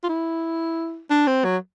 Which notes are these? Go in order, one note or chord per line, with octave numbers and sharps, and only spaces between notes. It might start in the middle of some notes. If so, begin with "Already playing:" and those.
F4
E4
D4
C4
F#3